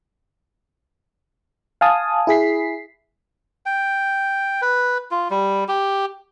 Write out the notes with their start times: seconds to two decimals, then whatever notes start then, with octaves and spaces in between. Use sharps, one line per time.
1.81 F5 G#5 A5 D#6
2.27 E4 G#4 B6 C7
3.66 G5
4.62 B4
5.11 F4
5.30 G3
5.68 G4